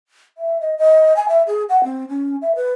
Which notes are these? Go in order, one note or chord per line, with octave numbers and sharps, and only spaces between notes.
E5
D#5
D#5
G#5
E5
G#4
F#5
C4
C#4
E5
B4